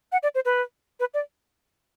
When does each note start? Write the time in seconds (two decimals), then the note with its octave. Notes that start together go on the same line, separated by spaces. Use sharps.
0.12 F#5
0.23 D5
0.35 C5
0.45 B4
1.00 B4
1.14 D5